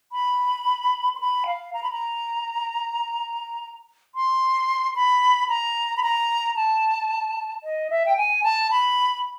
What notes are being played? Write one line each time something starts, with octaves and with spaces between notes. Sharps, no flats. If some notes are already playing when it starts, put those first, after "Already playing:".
B5
C6
B5
F5
A#5
B5
A#5
C6
B5
A#5
B5
A#5
A5
D#5
E5
G5
G#5
A5
B5